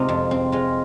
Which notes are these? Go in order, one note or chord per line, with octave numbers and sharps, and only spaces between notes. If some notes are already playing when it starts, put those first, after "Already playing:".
Already playing: C3 G#3 C4 D#4 F4
F2
C4
G#3 F4